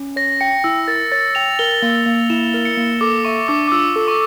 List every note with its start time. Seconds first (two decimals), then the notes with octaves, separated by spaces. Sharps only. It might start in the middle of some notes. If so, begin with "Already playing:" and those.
Already playing: C#4
0.16 C#5 A#6
0.41 G5 C#7
0.64 E4 E6
0.88 A#4 A6
1.12 C#5 A6
1.35 G5 F7
1.59 A#4 G7
1.82 A#3
2.06 A#3
2.30 E4 E7
2.54 A#4
2.65 C#7
2.77 A#3
3.01 A4 D6
3.25 E5 C#6
3.48 D4 D6
3.68 D6
3.72 F4 E6
3.96 A4
4.08 C#6